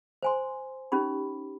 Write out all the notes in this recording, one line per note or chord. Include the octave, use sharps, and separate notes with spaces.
C5 G#5 C6
C#4 D#4 G4 B5